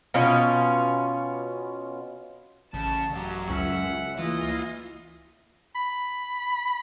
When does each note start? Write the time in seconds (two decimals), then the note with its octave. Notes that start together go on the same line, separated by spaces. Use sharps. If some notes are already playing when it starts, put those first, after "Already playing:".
0.14 B2 C#4 F4
2.74 A1 C#3 A5
3.14 F#2 F#3 G4
3.50 C#2 C#4 E5 F#5
4.18 E3 A#3 E4 F4 D#5
5.75 B5